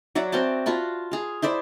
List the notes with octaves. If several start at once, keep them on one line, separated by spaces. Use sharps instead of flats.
F#3 D5 E5 F#5
C4 F#4 G5 A5
F4 F#4 A5 B5
G#4 F5
E4 C5 D5 E5